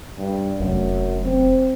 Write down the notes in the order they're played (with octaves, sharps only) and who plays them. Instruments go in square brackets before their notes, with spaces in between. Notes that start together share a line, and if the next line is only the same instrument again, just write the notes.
[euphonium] G2
[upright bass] F1 F#3 [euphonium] F#2
[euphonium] C4